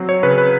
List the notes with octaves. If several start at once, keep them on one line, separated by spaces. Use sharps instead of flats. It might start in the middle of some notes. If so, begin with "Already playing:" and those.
Already playing: F#3 C4
C#5
C#3 B4
B4